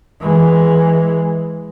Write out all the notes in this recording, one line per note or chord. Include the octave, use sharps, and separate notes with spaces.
E3 G#3